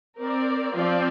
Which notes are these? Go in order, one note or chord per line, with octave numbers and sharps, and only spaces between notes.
C4 A#4 D5
F3 C4 F4 D5